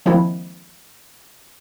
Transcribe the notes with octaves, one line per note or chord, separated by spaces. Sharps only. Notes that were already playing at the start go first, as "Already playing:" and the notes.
D#3 F3 G#3 A#3 C4 E4